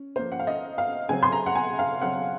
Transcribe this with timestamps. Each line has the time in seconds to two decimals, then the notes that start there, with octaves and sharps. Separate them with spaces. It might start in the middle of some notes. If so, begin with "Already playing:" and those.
Already playing: C#4
0.16 F3 A#3 C#4 C5
0.32 F#5
0.39 F5
0.47 D#5
0.78 F5
1.09 C#3 F#3 C4 G#5
1.23 C6
1.32 A#5
1.46 F#5
1.55 G#5
1.79 F5
2.02 C#3 F#3 C4 F#5